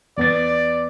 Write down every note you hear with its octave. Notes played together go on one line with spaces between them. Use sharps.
E2 B3 D5 A6